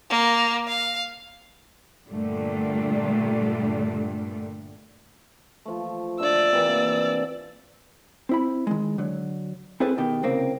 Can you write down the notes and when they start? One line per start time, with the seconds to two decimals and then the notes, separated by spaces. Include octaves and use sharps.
0.10 A#3
0.68 F5
2.08 G2 A#2 D3 G3 A3
5.66 F3 A3
6.20 D4 D5 E5 E6
6.52 C3 E3 A#3
8.29 C4 E4 B5
8.67 D#3 G#3
8.98 D3 F#3
9.80 C4 E4 G#4 A4 B4
9.98 B2 D#3 G4
10.23 C2 C#3 A#3 C4